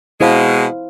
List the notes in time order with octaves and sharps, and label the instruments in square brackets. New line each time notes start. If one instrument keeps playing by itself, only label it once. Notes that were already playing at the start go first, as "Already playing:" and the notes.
[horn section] B2 G#3 [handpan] E4 C5 F5